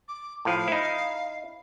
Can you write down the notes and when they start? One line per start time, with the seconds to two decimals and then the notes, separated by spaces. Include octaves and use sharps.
0.08 D6
0.45 A2 F3 F5
0.68 D#4 E4